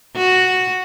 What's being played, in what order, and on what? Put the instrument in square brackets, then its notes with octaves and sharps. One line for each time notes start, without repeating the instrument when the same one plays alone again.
[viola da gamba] F#4